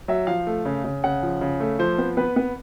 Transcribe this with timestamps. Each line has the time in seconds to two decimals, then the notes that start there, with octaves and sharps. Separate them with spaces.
0.08 F#3 E5
0.27 F3 F5
0.47 A3
0.65 C#3
0.84 C#3
1.04 C#3 F#5
1.23 F3
1.41 C#3
1.60 A3
1.79 F3 C5
1.98 B3
2.17 B3 B4
2.36 B3